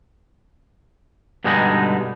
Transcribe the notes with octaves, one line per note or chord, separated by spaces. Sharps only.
G2 B2 D3 G#3 B3 D#4